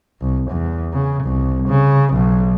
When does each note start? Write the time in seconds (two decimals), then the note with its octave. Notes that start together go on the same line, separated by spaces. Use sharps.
0.21 C2
0.50 E2
0.93 C#3
1.23 C2
1.68 C#3
2.13 B1